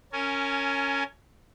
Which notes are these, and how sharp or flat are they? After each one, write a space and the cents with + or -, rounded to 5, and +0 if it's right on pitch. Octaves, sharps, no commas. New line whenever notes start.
C#4 +0 A#4 -25 G#5 +20